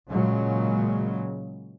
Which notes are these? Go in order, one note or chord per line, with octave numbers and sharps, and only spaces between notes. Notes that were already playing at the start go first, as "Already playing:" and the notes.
A#2 C#3 F#3 G#3